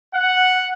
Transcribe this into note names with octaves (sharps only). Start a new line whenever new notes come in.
F#5